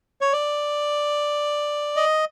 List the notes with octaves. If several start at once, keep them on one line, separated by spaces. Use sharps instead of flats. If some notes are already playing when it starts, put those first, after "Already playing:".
C#5
D5
D#5